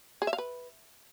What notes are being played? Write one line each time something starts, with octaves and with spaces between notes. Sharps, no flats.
G#4
E5
F5
B4